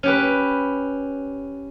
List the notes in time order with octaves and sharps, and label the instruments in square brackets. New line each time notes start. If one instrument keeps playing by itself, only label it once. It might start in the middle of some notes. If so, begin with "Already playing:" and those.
[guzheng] C#4 G4 B4